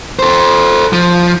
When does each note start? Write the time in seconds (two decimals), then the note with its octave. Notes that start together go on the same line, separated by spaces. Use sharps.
0.19 A4 C5
0.93 F3